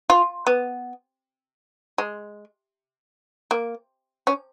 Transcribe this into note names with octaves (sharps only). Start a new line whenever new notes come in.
F4
B3
G#3
A#3
C#4